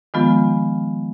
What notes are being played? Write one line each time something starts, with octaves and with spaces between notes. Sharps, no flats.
D#3 F3 G#3 B3 F4